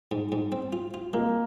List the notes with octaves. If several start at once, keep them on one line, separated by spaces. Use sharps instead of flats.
G#2
G#2
C4
F4
F4
G#3 A#3